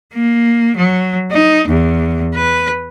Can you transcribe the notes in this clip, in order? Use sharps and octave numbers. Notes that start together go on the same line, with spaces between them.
A#3
F#3
D#4
E2
B4